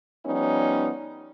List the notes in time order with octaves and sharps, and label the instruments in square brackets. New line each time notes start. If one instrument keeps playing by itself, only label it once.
[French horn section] F3 G3 B3 C#4 D#4